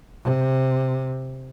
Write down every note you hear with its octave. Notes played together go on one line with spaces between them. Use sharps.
C3